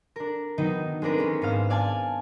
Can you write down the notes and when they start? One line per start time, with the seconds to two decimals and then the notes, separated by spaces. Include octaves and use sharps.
0.16 D4 A#4
0.58 D#3 F#3 B3 D#4
1.02 G#3 C4 D4 A#4 B4
1.18 G#3 C#4
1.41 G#2 B3 C5 F5 F6
1.70 D5 F5 G#5 A5